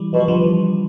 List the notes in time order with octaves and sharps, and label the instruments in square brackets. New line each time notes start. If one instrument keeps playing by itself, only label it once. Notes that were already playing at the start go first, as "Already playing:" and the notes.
Already playing: [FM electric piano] E3 G3
[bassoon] B2 [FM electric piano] F3
[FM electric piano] G3
D3 F3
E3